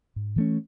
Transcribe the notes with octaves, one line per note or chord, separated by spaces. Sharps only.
G#2
E3 A3 C#4